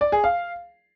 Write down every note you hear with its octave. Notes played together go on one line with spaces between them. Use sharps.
D5
G#4
F5